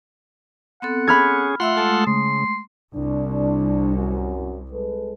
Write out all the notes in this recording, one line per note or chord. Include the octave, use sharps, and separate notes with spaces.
B3 C4 A4 F#5
C#4 G#4 B5 F6 G#6
A3 F4 E5 F#5 C6 E6
G#3 A3 A4 D#6
C#3 C6
C2 D4
F#2
G#3 A4 B4